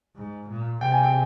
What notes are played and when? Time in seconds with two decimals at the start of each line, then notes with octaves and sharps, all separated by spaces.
0.16 G#2
0.49 A#2
0.81 C3 G5
0.92 G#5
1.03 G5